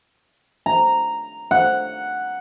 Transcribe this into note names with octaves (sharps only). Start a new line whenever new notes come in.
A#5
F#5